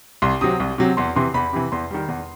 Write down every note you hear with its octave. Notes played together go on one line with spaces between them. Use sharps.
C2 C6
C3 F#3 C4 D#6
C2
C3 F#3 C4
E2 C6
C3 E3 C6
E2 B5
C3 E3
E2 C6
D#3 G3
E2